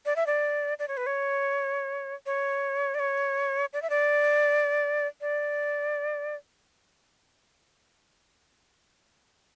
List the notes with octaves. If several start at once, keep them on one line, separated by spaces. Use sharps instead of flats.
D5
E5
D5
D5
C#5
B4
C#5
C#5
D5
C#5
D5
E5
D5
D5